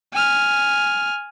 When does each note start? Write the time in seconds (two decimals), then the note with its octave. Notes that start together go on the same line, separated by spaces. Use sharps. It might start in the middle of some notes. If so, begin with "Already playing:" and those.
0.13 G#5 F6